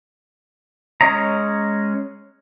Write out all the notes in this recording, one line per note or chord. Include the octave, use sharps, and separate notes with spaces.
G#3 C#4 C#5 D#5 A#5